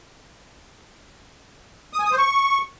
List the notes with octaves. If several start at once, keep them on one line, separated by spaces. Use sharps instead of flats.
D#6
G#5
D#6
C5
C#6